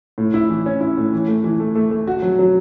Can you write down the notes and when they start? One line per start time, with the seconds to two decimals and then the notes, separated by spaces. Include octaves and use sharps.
0.18 A2
0.34 E4
0.50 E3
0.66 C#4
0.81 E4
0.97 A2
1.13 E3
1.28 A3
1.44 E3
1.60 A3
1.75 A3
1.91 A3
2.07 F#4
2.22 F#3
2.39 F#3